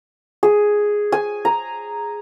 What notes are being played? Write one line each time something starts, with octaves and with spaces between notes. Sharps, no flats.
G#4
G#5
A#5